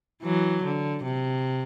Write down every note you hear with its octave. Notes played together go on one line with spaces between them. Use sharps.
E3 F#3
D3
C3